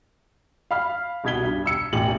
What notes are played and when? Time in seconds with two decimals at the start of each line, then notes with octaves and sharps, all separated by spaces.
0.71 F5 B5 F6
1.24 C2 B2 G3 G#6 B6 G7
1.45 G2
1.66 E6 C#7
1.93 E1 A1 E2 G4 F#7